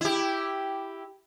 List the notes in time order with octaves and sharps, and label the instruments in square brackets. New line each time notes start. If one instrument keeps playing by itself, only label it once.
[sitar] E4 G4